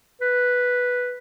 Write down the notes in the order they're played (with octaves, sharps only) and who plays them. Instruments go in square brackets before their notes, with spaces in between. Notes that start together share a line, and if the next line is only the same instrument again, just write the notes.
[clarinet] B4